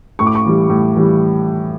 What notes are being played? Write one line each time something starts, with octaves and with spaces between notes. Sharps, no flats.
A2 C#6
D6
C#6
E3 G3
A2
E3 G3